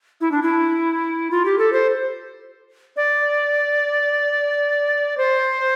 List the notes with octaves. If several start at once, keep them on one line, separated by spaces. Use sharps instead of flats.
E4
D4
E4
F4
G4
A4
C5
D5
C5